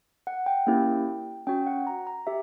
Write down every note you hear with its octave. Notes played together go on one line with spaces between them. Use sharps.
F#5
G5
A#3 C#4 E4 G4
C#4 F#4 G5
F#5
A#5
A#5
G4 E5